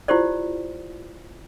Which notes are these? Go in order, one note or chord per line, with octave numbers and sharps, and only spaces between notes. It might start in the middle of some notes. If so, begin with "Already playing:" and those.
E4 F4 G4 C5 D5